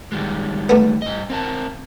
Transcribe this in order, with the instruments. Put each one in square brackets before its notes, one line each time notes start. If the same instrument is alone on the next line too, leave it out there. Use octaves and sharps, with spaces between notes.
[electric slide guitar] D#3 G3 G#3
[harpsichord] A3 B3
[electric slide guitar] G2 D#5
C4 A#4 A5